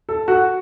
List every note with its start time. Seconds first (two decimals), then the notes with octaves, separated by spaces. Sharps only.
0.09 A4
0.28 F#4